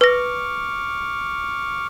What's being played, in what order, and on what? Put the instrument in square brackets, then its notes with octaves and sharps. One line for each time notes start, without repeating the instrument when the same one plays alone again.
[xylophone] B4 A#6 [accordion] C#6 D6 F6